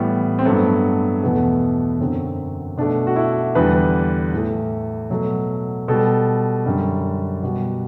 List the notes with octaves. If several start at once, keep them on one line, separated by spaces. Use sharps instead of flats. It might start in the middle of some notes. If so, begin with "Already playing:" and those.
Already playing: A2 E3 G3 B3
C4
G2 F#3 A3 B3
E2 B2 A3 B3
F#2 D3 F#3 C4
B2 A3 D4
F#4
E4
E2 D3 G3 B4
A2 E3 A3
B2 F#3 A3
B2 G3 A4
F#2 D3 G3
B2 G3 F#4